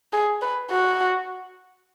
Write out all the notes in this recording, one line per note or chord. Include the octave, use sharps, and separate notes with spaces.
G#4
B4
F#4